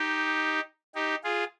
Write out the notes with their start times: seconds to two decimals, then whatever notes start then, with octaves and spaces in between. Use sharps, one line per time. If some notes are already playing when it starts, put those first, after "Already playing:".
Already playing: D#4 G4
0.95 D#4 G4
1.24 F4 G#4